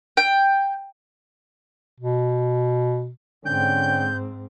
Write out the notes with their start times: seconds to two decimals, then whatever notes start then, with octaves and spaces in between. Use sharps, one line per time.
0.17 G5
2.00 B2
3.45 G#2 D3 C4 C#4 G5 G6